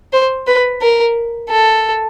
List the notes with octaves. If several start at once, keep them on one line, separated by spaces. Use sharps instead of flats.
C5
B4
A#4
A4